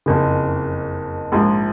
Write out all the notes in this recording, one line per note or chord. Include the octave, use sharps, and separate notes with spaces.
F#1 F2 C#3
A#1 G#2 F3